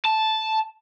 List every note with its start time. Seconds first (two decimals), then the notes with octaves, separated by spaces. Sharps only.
0.05 A5